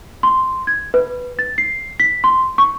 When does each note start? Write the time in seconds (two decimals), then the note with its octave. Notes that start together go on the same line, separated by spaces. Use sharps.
0.23 C6
0.67 G#6
0.94 B4
1.39 A6
1.58 C7
2.00 B6
2.24 C6
2.58 C#6